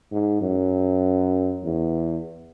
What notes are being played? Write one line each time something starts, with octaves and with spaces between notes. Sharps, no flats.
G#2
F#2
E2